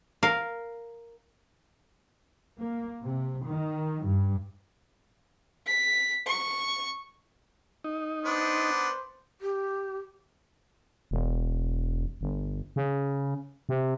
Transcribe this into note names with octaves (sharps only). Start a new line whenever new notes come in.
A#4 F5
A#3
C3
D#3
G2
B6
C#6
D#4
B3 D4 C5
G4
E1
G1
C#3
C3